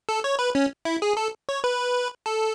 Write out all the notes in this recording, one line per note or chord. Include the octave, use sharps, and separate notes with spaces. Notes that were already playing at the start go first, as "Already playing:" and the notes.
A4
C#5
B4
C#4
E4
G#4
A4
C#5
B4
A4